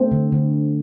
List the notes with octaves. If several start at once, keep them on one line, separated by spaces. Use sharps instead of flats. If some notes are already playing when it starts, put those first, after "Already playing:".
Already playing: A3 C4
D3
D3